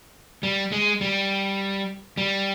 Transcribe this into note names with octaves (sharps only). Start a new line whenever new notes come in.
G3
G#3
G3
G3